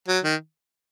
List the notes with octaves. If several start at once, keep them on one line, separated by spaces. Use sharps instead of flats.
F#3
D#3